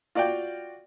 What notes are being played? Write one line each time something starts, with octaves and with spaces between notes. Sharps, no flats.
F4 F#4 D5 F5 G5